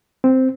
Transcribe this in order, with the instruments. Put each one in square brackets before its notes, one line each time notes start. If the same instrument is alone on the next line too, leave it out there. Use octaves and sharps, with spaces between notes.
[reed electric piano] C4